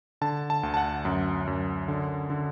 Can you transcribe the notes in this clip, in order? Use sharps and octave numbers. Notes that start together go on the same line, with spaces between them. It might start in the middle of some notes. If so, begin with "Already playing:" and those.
D3 A5
A5
D2
A5
F#5
F#2
F#2
D3
D3